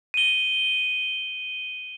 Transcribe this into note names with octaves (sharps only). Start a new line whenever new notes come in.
D#7 G7